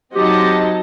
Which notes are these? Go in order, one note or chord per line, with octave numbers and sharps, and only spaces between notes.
F#3 C4 D#4 G4 D#5 A5